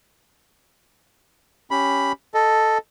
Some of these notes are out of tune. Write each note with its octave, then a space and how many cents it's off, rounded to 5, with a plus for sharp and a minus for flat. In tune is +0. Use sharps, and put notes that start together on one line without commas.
C#4 +0 G4 -5 B5 +0
A4 +0 D#5 +0